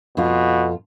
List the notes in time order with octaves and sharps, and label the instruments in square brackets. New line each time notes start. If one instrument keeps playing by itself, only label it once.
[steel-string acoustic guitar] F2 F4 [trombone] B2